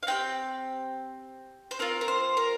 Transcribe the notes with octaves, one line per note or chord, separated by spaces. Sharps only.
F5
C4 D#4 G4 G5
C5
C4 F4 A#4
A#4
C5
A#4